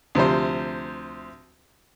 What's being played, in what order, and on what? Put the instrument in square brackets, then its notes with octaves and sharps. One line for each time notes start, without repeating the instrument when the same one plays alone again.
[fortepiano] D2 C3 F3 C5